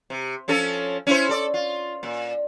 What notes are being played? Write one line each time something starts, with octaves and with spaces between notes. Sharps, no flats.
C3
F3 C#4 A4
C#4 E4 C5
A4 D5
F4
A#2